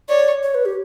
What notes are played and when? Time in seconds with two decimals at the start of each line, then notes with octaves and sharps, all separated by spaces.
0.08 C#5 D5
0.43 C#5
0.54 B4
0.65 G4